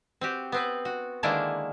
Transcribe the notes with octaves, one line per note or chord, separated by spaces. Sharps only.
C4 F#4 G4
B3 C4 B4
F#4
D3 D#3 G#3 A#3 D4 E4